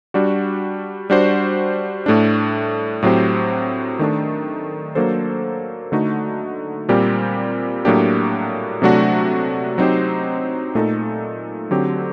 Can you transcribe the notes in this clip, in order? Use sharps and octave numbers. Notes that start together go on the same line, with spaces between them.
G3 D4 F#4
G3 D4 F#4 C5
A2 A3 D4
A2 F#3 C4 G4 C5
D#3 A3 D4
F#3 A#3 D4 A4 C5
D3 A3 D#4 F#4
A#2 G3 C4 G4 A#4
A2 F#3 A#3 D4 G4
C3 F#3 A3 D4 F#4
F#3 C4 D#4 G4 C5
A#2 A3 D#4 A4
D3 F#3 C4 G4